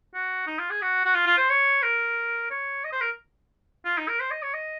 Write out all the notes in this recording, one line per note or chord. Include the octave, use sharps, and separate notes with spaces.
F#4
D#4
F4
G#4
F#4
F#4
F4
F4
C5
C#5
A#4
C#5
D#5
C5
A#4
F4
D#4
A#4
C5
D#5
C#5
D#5